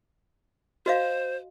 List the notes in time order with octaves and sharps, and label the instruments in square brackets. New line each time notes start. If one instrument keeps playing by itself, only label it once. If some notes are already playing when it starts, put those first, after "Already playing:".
[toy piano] F#4 D#5 F5 [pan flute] C5